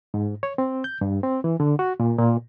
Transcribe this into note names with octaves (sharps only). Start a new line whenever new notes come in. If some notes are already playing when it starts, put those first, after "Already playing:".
G#2
C#5
C4
G6
G2
C4
E3
D3
F#4
A#2
A#2